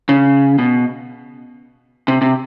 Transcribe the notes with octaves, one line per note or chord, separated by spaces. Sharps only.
C#3
B2
C3
C3